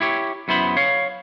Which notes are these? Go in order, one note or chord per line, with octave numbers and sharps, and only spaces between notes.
E4 G4 C#5
F#2 B3 E4 C5 B5
C#5 F5